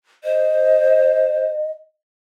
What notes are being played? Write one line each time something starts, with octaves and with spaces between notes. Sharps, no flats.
C5 D#5